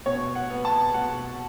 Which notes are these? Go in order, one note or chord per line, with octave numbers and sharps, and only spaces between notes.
B2 C#5
F#5
B3
A5
B2 F#5